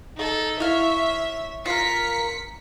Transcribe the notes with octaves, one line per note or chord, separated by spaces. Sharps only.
D#4 A4
E4 C#5 E5 F5
F4 A#4 B6 C#7